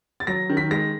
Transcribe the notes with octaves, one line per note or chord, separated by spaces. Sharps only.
A6
F#3 A#6
D#3
B6
G#3 A#6